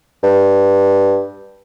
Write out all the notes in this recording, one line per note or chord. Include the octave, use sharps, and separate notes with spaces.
G2